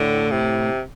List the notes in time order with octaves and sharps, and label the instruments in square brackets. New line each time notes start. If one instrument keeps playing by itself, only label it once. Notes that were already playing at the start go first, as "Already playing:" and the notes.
Already playing: [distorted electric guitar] A2 [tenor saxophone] D3
[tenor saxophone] C3